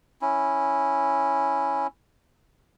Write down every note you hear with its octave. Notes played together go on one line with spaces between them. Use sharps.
C#4 E4